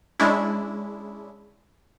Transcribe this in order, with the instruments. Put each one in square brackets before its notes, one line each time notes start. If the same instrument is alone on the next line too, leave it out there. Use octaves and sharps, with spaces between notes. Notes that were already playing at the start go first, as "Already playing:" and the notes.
[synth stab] G#3 C#4 D4 E4